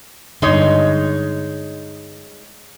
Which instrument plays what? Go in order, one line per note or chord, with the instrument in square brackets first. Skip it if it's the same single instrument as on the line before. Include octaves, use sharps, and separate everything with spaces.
[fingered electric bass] G2 D3 [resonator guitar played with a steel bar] G#3 D#4 C#5